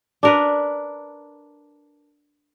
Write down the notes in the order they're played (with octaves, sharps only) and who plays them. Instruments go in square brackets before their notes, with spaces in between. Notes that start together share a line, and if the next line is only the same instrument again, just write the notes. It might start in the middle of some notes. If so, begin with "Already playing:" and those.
[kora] D4 A#4 B4